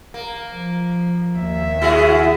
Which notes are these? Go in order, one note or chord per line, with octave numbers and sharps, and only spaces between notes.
A#3
F3
D#2 E5
E4 F#4 G#4